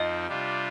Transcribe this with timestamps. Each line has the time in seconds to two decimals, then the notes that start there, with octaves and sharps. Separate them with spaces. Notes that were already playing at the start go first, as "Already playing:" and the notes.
Already playing: F2 F3 C4 D#4 D#5
0.27 C3 G3 D4 F4